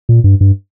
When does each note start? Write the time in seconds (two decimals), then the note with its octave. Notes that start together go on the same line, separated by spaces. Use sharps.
0.09 A#2
0.24 G2
0.41 G2